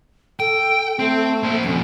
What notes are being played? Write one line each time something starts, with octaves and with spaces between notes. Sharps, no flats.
A4 G5
A3 C4
A#3 C5
F2 B2 C#4